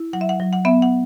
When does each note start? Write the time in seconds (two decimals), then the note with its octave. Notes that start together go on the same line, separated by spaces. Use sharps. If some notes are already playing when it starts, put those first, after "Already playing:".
Already playing: E4
0.13 F#3 F#5
0.21 E5
0.29 F#5
0.40 F#3
0.53 F#5
0.65 B3 E5
0.82 F#5